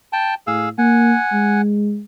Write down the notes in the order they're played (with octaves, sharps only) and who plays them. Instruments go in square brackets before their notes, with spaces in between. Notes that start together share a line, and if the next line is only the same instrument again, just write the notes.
[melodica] G5 A5
[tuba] A2 [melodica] G#4 F5 E6
[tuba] A#3 [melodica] F#5 G#5
[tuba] G#3